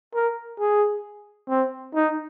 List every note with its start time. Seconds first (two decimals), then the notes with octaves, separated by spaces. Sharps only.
0.15 A#4
0.60 G#4
1.49 C4
1.95 D#4